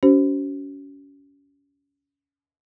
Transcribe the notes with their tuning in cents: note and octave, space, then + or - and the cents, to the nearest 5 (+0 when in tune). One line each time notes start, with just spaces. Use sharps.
C#4 +25 F#4 +40 C5 +0